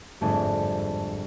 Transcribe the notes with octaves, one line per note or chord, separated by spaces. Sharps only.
G1 F2 G#2 A3 D4 G#4